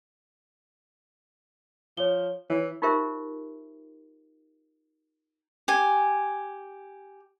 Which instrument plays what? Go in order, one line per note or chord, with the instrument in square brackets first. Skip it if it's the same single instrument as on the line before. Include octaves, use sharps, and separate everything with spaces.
[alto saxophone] F3 [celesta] C#5 G7
[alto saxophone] E3 [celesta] C#5
[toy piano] D#4 F4 G4 A#4 C5 E5
[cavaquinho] G4 G#5